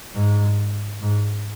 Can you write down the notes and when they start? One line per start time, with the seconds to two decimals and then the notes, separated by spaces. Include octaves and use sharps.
0.14 G#2
1.02 G#2